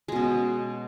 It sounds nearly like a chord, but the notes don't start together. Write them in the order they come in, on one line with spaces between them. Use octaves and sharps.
G#3 B2 C#4